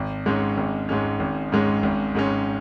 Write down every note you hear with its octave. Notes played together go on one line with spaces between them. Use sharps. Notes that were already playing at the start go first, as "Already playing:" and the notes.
Already playing: G#1
G#2 G#3 C#4
G#1
G#2 G#3 C#4
G#1
G#2 G#3 C#4
G#1
G#2 G#3 C#4